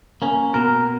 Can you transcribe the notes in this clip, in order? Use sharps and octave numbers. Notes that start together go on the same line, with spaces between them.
A#3 C#4
B2 A#4